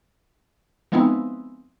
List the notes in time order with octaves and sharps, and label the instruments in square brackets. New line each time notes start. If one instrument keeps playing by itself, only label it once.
[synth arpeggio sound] F3 G#3 B3 C4 D#4 E4